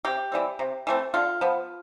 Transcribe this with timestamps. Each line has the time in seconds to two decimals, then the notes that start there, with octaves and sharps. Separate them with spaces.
0.05 C3 G4
0.32 E3 G3 C4
0.59 C3
0.87 E3 A3 C4
1.14 D3 F4
1.41 F3 B3